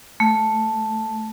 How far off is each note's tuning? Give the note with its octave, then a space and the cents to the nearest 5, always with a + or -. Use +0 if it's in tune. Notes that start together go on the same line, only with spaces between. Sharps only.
A3 +0